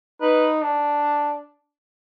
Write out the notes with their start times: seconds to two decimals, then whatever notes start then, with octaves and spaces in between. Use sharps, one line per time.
0.21 D#4 B4
0.62 D4